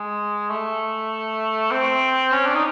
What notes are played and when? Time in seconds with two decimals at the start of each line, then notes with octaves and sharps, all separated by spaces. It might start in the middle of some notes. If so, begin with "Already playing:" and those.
Already playing: G#3
0.50 A3
1.71 C4
2.32 C#4
2.46 D4
2.55 D#4